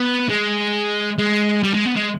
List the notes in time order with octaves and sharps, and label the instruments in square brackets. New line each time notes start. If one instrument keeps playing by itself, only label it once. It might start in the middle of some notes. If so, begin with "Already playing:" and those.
Already playing: [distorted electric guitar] B3
G#3
G#3
G3
G#3
B3
G#3